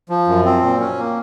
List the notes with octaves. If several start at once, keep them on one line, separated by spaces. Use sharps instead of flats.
F3
F#2
C4
A#2
C#4
A#3